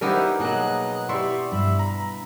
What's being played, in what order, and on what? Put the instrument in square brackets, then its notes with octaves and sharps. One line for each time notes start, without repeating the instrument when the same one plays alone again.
[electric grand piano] G3 C5 [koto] B3 D#4 A#4 [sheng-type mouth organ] E4 G4
[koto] B2 F#3 [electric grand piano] A#3 [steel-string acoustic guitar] G#4 [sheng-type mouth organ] D#5 F#6
[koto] E4 [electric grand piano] G4 C6 [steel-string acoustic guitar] D5 [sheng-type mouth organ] C#6
[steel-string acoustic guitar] G2 [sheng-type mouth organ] E5 B5
[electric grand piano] A#5 [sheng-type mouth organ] B5